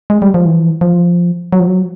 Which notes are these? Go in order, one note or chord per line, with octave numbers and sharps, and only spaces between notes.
G#3
G3
F3
E3
F3
F#3
F3
F#3